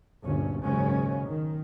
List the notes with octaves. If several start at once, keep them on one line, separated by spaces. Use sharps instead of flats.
G1 D2 A#2 C#4
F#1 D#2 G#2 C#3 G#3 C#4
D#3